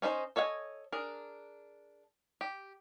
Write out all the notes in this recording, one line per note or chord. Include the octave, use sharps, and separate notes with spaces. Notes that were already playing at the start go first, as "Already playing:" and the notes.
C#4 D#4 F4 C5
A4 C#5 D#5 F5 G#5
D4 G#4 A#4
G4